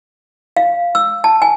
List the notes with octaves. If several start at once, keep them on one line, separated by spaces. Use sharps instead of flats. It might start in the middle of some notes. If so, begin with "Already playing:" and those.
F5
E6
A5
G#5